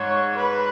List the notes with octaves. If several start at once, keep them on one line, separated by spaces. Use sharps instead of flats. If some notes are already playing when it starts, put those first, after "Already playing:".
Already playing: G#2 C#5
B4